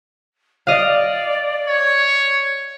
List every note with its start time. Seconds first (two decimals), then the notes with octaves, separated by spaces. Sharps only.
0.67 D5 D#5 F5
1.67 C#5